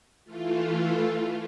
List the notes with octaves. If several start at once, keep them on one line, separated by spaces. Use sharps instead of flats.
E3 A3 F4